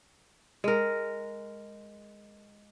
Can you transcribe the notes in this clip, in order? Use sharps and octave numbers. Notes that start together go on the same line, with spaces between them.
G#3 A#4